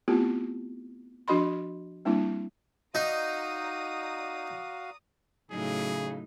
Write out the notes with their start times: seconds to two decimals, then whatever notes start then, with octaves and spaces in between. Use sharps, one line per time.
0.08 A3 B3 C4 E4 F4 G4
1.28 F3 D4 F#4 D#5 B5 C6
2.05 G3 A#3 C4 D4 E4
2.95 D#4 F#4 D5 F5 A#5 D#6
5.51 A2 C#3 F#3 D#4 G#4